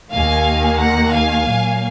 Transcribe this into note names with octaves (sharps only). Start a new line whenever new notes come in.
D#2 D#3 A#3 F5 G#5
F#5 A#5
F5 G#5
A#2 F#3 A#3